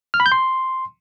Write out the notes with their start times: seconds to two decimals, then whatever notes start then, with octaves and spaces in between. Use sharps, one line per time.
0.14 F6
0.20 B5
0.26 G6
0.32 C6